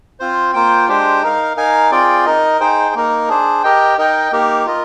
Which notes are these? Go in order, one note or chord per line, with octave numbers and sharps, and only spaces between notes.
C4 F4 C5
A#3 F4 C5 G5
G#3 D4 G4 C5 G5
D#4 A#4 F5
D#4 A#4 F5 G#5
C4 F4 G#4 D5 G5
D#4 A#4 D#5
D#4 G#4 C5 G5
A#3 D#4 A#4
D4 G#4 C5
G4 A#4 D#5 G5
D#4 A#4 D#5 G5
A#3 D#4 G4 A#4
F4 A#4 D#5